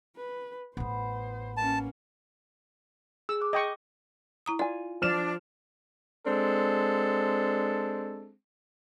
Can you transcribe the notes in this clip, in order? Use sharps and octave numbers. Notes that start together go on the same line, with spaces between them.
B4
A1 A2 B3 C5
A#3 C#4 A5
G#4 E6
D6 F#6
D#5 G5 C#6
E4 A#5 D#6
F4 D5 G#5
F3 D4 F6 E7
G#3 C4 D4 A4